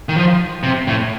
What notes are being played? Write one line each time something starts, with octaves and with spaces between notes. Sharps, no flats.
D#3
F3
C3
A2